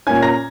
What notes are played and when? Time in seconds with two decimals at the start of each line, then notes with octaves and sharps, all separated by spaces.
0.07 A#2 A#3 C#4 G#5 G#6
0.23 A#5 A#6